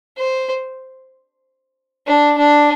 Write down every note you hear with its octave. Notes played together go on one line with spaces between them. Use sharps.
C5
D4
D4